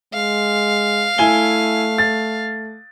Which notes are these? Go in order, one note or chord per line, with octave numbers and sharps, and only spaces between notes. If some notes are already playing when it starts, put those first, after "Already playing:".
G#3 F5
A3 E4 G#5 G7
A6